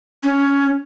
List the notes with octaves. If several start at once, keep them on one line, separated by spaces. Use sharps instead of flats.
C#4